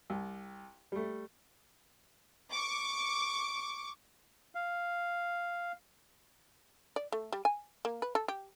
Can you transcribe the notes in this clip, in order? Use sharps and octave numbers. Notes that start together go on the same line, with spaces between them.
C2
G3 A3
C#6 D6
F5
D5
A3
G3
G#5
A#3
B4
A4
G4